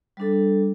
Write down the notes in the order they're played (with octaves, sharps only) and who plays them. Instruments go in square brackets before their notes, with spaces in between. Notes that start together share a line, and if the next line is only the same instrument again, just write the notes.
[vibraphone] G3 D4 A4